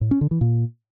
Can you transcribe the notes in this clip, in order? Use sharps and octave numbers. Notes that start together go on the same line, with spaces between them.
A2
C#4
D3
E3
A#2